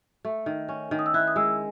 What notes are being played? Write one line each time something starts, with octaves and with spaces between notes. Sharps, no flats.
A3
D#3
C#4
D#3
D#6
E6
E4 F#6
D#6
G#3 E6